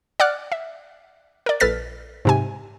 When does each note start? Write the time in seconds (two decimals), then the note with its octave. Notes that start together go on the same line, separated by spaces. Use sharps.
0.20 D5 F#5 D6 F6 F#6
0.52 E5
1.46 A#4 D5
1.60 A#1 A4 B4 F6 A6 B6
2.25 G#2 C3 G#5